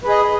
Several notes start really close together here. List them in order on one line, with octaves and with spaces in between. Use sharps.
B4 G#4 D#5